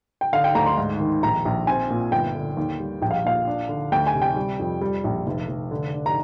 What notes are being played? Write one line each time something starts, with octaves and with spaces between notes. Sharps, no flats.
G5
D3 F5
G5
D2 A#5
C6
G#2
D#3
A#1 A#5
A#1
C4 G#5
A#2
G1 G5
D3
D#2
G3
A#1 G5
F5
A#2 F5
D4
D3
D2 G5
G#5
C3
G5
G3
F2
G3
A#1
F1
F1
D3
D4
A#5